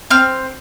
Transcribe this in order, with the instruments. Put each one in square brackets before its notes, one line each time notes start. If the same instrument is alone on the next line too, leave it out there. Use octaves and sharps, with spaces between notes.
[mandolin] C4 F6